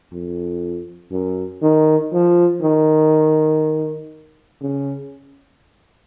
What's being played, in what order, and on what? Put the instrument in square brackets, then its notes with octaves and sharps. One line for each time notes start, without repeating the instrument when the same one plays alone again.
[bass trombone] F2
F#2
D#3
F3
D#3
C#3